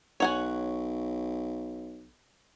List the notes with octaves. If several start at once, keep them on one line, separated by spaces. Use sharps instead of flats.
B1 C#5 F#5 G#5